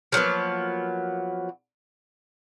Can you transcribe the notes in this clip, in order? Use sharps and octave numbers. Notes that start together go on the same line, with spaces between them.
F3 F#3 A#3 B3